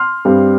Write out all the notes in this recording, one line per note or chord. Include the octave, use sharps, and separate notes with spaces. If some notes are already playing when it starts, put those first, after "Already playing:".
Already playing: C6 F6
G2 G3 C4